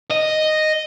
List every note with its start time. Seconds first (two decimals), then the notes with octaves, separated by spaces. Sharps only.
0.10 D#5